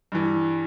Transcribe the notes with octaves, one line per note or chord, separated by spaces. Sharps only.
G2 E3